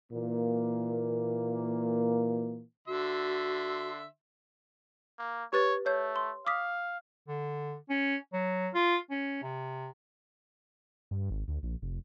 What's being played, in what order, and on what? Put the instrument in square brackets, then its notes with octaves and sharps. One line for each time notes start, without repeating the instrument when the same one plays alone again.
[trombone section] A#2 E3 A#3
[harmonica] D3 E5 C6 [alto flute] F#4
[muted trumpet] A#3
[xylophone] G4 B4 A6 [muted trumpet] C#5
[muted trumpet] A3 [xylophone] C#5 G6
[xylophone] C6
[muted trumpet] F5 [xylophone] D6 D#6 B6
[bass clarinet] D3
C#4
F#3
F4
C#4
C3
[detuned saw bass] G2
G#1
D2
A#1
F1